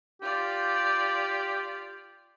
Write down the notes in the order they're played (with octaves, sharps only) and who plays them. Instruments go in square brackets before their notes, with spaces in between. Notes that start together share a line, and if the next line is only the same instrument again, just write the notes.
[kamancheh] F4 D5 [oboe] G4